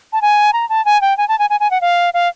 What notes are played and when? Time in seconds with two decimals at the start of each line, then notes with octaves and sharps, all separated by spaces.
0.13 A5
0.22 G#5
0.53 A#5
0.69 A5
0.85 G#5
1.02 G5
1.18 G#5
1.28 A5
1.39 G#5
1.50 G#5
1.60 G#5
1.71 F#5
1.81 F5
2.14 F5